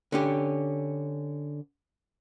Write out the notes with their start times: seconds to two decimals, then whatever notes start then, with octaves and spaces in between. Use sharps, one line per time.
0.12 D3 C#4 G4